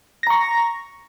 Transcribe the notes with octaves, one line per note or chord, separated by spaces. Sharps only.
A#5 C#6 A#6